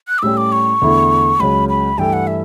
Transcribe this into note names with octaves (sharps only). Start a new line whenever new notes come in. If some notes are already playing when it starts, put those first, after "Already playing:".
F#6
D6
A2 G3 C#4 G4 E6
D6
C#6
E2 D3 A3 E4 A4
C#2 C#3 F#3 C#4 B5
B5
G2 E3 A3 E4 A4 G5
F#5
E5